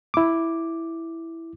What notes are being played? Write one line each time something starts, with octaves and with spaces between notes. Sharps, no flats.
E4 D6